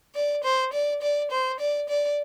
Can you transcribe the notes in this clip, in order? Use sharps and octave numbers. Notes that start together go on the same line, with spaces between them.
D5
C5
D5
D5
C5
D5
D5